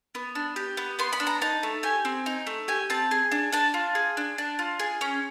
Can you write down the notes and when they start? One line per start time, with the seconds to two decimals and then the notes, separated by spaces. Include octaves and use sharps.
0.15 B3
0.35 D4
0.56 G4
0.77 B3
0.99 B3 C6
1.13 B5
1.20 D4
1.27 A#5
1.42 D#4 A5
1.63 A3
1.83 G4 G#5
2.05 C4
2.26 D#4
2.47 A3
2.68 G4 G#5
2.90 C4 A5
3.11 G#4
3.32 D4
3.52 D4 A5
3.74 F4
3.95 G#4
4.17 D4
4.38 D4
4.59 F4
4.79 G#4
5.01 C#4